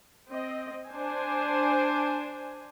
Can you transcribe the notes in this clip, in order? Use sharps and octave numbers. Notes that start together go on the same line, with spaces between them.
C4 D#5
D4 C5 G#5